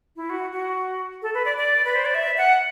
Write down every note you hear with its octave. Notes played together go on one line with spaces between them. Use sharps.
E4
F#4
F#4
A4
B4
D5
D5
B4
C5
D5
E5
F#5